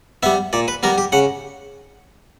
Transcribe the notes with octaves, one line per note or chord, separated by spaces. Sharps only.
G3 B3 E5
A#2 D5
B4
G3 B3 A#4
G4
C#3 F#5